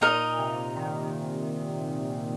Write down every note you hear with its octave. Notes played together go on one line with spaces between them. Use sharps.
A#2 D#4 A#4 D#5
C3
D#3